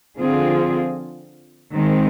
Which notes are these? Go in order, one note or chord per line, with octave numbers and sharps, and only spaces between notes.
D3 F3 C4 F4 G#4
D#3 G#3 C4